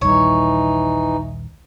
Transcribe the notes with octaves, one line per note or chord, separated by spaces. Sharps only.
A#1 D#2 E3 G3 D#4 C#5